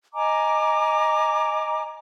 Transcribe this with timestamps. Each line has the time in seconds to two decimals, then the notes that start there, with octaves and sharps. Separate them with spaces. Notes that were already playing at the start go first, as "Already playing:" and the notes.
0.15 D#5 G#5 A#5 D6